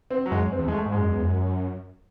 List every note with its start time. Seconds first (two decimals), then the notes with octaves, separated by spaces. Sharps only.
0.10 C4
0.26 F#3
0.32 F#2 G#3
0.52 C4
0.59 E2
0.68 G#3
0.72 A3
0.86 G#2
0.92 G#3
0.98 F#2
1.09 E2
1.21 F#2